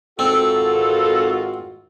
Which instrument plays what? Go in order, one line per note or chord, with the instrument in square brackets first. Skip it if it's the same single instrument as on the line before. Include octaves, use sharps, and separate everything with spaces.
[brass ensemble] G#1 F4 F#4 [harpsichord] C4 [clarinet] A4